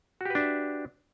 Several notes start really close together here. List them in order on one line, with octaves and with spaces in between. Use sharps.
F#4 G4 B4 D4 E5